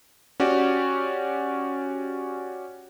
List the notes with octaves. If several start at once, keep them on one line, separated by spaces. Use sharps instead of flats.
C#4 F#4 G4 D5